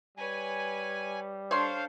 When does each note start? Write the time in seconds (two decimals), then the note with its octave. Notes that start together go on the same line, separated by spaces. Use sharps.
0.18 G3 B4 C#5 G#5
1.51 D4 A4 C5 C#5 F5 C6